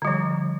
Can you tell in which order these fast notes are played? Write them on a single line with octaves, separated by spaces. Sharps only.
D3 G3 F3